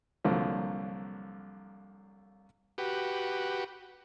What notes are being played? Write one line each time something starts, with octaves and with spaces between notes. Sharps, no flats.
C2 D3 F3 F#3 A#3
F#4 G4 B4